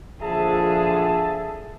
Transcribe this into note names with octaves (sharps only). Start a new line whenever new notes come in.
A#1 D3 F3 G#4 E5 A5